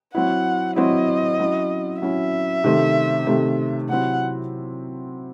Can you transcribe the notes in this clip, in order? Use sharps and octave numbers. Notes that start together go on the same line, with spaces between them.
F#3 C4 E4 F#5
F#3 C4 E4 D#5
F#3 C#4 E4
F#3 C#4 E4 E5
C3 D#3 A3 C4
C3 D#3 A3 C4
C3 F#3 C4 E4 F#5